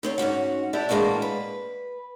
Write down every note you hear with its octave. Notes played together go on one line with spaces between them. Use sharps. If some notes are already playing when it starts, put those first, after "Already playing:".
D2 C4 C#5
G#2 C#4 F#4 F#5
D4 E4 G4
A2 E3 G#3 A#3 D4 F#4
B4